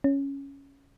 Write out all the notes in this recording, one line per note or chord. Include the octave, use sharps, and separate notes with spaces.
C#4